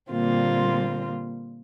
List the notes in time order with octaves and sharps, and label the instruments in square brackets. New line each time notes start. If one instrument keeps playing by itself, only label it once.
[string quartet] A#2 D3 G3 A#3 C4 F4